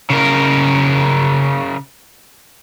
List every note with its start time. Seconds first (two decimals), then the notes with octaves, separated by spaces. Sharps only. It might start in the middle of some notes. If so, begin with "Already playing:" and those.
0.10 C#3 A#4